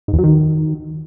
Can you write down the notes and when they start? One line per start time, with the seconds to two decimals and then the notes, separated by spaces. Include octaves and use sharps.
0.08 G#2
0.13 E2
0.18 F#3
0.24 D#3